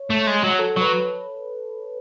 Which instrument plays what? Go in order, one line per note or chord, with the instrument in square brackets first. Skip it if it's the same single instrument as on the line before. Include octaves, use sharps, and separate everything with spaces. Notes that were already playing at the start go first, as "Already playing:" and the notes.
Already playing: [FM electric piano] C#5
[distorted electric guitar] A3
G#3
F#3
[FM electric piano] A4
[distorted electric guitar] F#3 [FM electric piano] B4